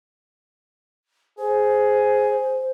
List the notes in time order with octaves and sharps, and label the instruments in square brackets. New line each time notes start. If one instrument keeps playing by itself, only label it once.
[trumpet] G#4 [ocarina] C5